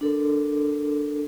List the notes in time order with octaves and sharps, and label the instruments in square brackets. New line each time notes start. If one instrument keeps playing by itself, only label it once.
[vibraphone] D4 A4 A#4